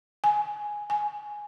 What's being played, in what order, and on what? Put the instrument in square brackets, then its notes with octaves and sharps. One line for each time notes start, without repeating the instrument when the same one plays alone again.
[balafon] G#5
G#5